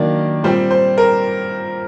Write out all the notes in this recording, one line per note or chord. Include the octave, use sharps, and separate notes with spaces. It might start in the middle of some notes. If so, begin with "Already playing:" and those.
Already playing: D#3 F#3 A#3 D4 D5
A#2 G3 C4 C5
C5
A#4